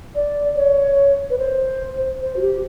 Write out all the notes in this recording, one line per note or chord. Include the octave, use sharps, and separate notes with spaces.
D5
C#5
B4
C5
C5
F#4
G4